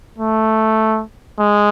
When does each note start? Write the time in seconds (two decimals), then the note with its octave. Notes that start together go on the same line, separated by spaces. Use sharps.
0.18 A3
1.39 G#3